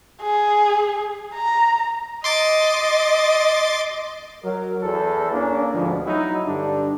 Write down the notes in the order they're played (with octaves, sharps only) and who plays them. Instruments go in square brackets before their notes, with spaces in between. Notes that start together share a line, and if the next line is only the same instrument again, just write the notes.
[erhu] G#4
A#5
[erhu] D#5 [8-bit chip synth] C6 D6 A6
[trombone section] F#3 A#4
E2 A4
A#3 C#4 D4
D2 G#2 B2 F3
F#3 D#4 E4 F#4
G2 D3 D4